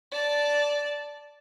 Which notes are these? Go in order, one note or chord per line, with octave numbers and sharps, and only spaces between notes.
D5 A5